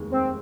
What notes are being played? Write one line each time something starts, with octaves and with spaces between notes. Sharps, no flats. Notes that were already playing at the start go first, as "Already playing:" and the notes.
Already playing: F1 D#2 D#3 G#3
C4